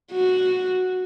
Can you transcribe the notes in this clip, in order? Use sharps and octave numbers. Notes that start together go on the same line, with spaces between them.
F#4